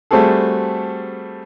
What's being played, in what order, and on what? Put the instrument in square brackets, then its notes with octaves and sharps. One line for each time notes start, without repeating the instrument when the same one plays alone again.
[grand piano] G3 A3 C4 F#4 G#4 A4